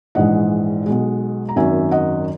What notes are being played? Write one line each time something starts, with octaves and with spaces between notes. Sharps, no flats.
A#1 G#2 E3 G#3 D#5 F#5
B1 B2 G#3
A#5
G#1 F#2 D#3 F#3 E5 G#5
D#5 F#5